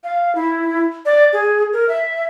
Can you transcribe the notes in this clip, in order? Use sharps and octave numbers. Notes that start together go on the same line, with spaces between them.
F5
E4
D5
G#4
A#4
E5